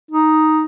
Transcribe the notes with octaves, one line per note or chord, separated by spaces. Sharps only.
D#4